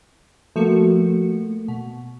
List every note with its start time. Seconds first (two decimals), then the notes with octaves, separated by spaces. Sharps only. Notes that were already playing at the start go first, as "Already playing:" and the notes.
0.56 F3 A3 A#3 F#4 C#7
1.68 B2